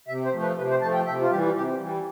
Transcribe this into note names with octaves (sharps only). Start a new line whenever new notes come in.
C3 E5
C5
F3 A3
B4
C3 B4
C5
F3 A3 A5
G5
C3 E5
F4
E3 G3 G4
C3 G4
E3 G3